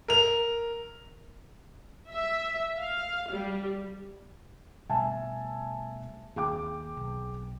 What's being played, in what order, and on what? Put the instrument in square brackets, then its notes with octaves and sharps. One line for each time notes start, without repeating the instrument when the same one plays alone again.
[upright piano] A#4 F7
[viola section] E5
F5
G3
[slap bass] B2 G3 A3 [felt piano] E5 G#5 A5
[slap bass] D#2 [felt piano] G#4 G5 D6
[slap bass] B1